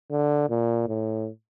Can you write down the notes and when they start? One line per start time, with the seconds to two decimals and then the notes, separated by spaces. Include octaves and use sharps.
0.11 D3
0.50 A#2
0.88 A2